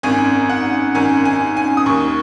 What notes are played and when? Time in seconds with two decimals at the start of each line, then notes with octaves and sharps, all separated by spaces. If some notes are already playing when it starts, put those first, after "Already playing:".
0.03 G#1 F#2 D#3 G#5
0.49 F#5
0.95 G#1 F#2 D#3 G#5
1.25 G#5
1.57 G#5
1.77 D#6
1.86 D#2 D#3 C#6